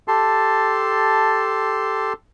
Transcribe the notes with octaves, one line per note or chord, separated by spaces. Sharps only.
G4 A4 A5 C6